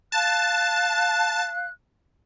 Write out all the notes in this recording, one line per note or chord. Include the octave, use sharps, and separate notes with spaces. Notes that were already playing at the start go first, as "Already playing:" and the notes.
F5 A5 F#6